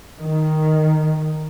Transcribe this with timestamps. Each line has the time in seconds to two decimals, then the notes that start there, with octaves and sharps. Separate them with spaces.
0.20 D#3